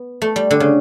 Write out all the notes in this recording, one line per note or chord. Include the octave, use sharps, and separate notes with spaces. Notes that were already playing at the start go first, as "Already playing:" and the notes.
Already playing: B3
A3
G3
D3
C#3